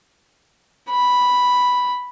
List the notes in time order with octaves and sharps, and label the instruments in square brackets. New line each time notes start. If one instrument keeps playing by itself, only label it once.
[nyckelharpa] B5